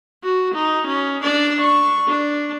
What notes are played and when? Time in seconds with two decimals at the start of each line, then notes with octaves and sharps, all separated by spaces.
0.23 F#4
0.54 D#4
0.86 C#4
1.23 D4 D5
1.61 C#6
2.08 D4